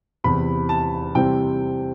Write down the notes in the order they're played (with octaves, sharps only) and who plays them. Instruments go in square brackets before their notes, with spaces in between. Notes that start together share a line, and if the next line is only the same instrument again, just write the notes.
[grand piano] E2 C3 E3 B5
A5
C3 E3 G3 C4 G5